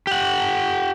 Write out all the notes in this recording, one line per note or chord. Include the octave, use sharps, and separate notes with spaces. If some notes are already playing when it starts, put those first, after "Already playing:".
G4 F#5